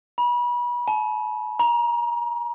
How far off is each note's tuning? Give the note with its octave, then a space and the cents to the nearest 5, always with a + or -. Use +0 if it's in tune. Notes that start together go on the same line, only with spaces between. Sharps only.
B5 -35
A5 -45
A#5 +30